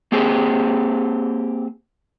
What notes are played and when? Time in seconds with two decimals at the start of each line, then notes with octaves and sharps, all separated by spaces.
0.12 A#3 C4 G4 G#4